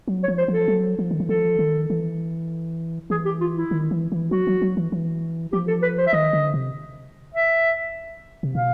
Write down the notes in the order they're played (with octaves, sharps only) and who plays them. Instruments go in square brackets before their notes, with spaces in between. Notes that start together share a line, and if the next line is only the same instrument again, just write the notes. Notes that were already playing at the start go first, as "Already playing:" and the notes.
[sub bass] F#3
[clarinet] C#5
[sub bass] F3
[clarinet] C5
[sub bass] F3 [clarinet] A4
[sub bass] F#3
F3
D#3
E3
[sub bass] F3 [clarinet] A4
[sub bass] D#3
E3
[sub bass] E3 [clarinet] G#4
[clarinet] G4
F4
E4
[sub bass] D#3
E3
E3
[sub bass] F#3 [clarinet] F#4
[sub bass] F#3
F#3
E3
E3
[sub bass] F3 [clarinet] G4
[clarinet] A4
B4
C5
E5
[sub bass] D#3 [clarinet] D#5
[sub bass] D3
C3
[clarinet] E5
[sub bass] C3
[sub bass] B2 [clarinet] F5